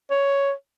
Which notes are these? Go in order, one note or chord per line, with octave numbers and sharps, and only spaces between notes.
C#5